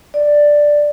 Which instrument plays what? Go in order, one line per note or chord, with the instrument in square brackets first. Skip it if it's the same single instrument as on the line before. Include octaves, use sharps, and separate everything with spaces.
[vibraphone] D5